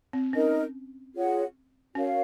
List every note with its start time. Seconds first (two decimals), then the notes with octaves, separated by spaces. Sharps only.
0.13 C4
0.33 C#4 D#4 A#4 D#5
1.14 F4 G#4 C#5 F#5
1.95 C#4 F#4 A#4 C#5 F5